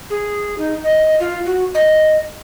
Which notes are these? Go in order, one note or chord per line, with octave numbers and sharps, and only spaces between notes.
G#4
D#4
D#5
F4
F#4
D#5